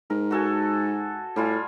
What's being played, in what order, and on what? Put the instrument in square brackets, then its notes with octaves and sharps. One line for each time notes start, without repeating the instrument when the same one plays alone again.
[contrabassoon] G#2 [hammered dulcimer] A#4
[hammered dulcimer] F#4 A4 G#5
[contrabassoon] A2 [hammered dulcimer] G3 F4 G#5